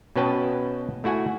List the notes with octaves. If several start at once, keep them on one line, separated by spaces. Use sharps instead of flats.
B2 C#4 F#4 B4 G5 A5
A3 E4 F#4 F#5 G#5